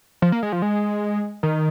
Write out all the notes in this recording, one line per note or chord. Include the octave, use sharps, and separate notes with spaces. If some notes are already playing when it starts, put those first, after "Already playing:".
F3
A#3
G#3
F3
G#3
D#3